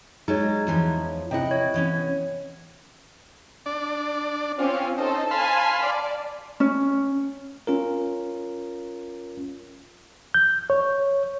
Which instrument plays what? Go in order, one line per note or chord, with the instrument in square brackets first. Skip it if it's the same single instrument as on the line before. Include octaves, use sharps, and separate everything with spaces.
[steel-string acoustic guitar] F#3 G#3 [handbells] D#4 C#5
[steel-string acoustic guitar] E2 E3 F3
[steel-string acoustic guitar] C3 F#5 [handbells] E4 D#5 G5
[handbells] C#5
[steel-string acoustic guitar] E3 B3 C#4
[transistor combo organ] D4 D5
[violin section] C4 C#4 [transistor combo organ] F4
[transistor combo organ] D#4 [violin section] A4 C5
[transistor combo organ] F5 B5 C6 [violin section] G#5 A5
[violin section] D5
[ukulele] C#4
[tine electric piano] C#4 F4 A#4
[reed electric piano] G6
C#5